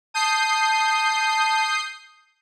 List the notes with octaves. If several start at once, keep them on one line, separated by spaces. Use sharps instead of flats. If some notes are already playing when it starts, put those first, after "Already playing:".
A5 D#6 G6 C7